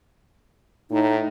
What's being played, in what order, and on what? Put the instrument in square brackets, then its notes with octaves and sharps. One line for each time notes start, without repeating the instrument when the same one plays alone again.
[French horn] A2 [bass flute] D#4